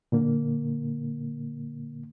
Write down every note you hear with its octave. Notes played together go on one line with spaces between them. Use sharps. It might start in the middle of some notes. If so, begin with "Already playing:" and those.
A#2 D3 A#3